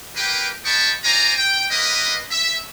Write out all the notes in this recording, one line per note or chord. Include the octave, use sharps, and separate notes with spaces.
A#3 G4 A#4 B4 G5
B3 D#5 G5 A5 B5 C#6
F4 C5 D5 G#5 A#5
G5
A#3 B4 D#5
E5